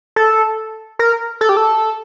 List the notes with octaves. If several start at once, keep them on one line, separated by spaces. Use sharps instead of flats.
A4
A#4
A4
G4
A4